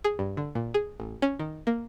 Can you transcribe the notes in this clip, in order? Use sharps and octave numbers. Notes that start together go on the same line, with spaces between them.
G#4
G2
D3
A#2
G#4
A1
C#4
D#3
A#3